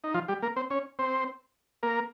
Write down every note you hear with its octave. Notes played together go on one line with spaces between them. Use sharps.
D#4
F3 F4
G3 G4
A#3 A#4
C4 C5
C#4 C#5
C4 C5
A#3 A#4